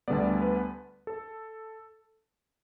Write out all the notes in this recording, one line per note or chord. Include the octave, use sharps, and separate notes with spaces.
D2 D3 G3 B3 D5
B4
A4